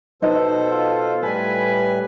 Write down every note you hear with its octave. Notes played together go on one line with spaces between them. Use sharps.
B2 D#4 A4 B4 C5 D#5
F4
A2 G3 A4 B4 G#5